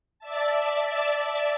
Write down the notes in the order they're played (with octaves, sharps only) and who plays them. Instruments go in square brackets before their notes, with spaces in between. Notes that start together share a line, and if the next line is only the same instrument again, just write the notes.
[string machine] D5 E5 A5